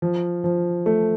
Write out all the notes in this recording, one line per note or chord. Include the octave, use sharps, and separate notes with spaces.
F3
F3
A3